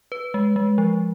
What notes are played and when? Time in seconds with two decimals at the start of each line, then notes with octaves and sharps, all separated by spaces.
0.12 B4
0.34 G#3
0.56 G#3
0.78 F3